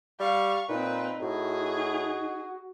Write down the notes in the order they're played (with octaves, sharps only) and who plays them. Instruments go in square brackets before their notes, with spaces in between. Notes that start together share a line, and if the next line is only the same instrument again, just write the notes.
[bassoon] G3 [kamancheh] F5 C#6
[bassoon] A#2 [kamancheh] C4 B4 [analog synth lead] D#4
[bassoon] A2 [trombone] F#4 [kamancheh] G#4